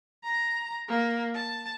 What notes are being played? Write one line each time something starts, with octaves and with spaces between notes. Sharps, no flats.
A#5
A#3
A5